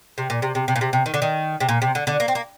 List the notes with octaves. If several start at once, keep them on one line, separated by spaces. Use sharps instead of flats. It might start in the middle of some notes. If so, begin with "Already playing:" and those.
C3
A#2
C3
C3
C3
A#2
C3
C3
D#3
D3
D#3
C3
A#2
C3
D3
D3
A#3
C4
A#3